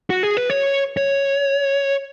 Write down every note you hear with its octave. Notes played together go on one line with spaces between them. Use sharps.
F#4
G#4
B4
C#5
C#5